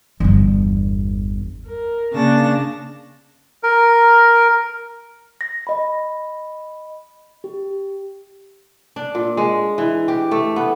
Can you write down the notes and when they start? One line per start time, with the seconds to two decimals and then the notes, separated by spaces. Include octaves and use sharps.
0.20 G1 E2
1.65 A#4
2.13 C#3 A#3 D4 A5 A#6
3.63 A#4
5.41 A#6
5.67 D#5 B5
7.44 G4
8.96 D4
9.15 A#2
9.37 G#3
9.78 E3
10.08 G4
10.31 A3
10.56 B3